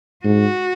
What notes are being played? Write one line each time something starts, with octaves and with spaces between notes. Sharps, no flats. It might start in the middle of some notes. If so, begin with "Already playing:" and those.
G#2 F#4